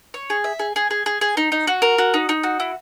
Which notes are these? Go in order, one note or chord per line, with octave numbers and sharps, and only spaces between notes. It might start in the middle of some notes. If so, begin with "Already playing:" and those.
C#5
G#4
E5
G#4
G#4
G#4
G#4
G#4
D#4
D#4
F#4
A#4
F#4
D#4
D#4
F#4
E4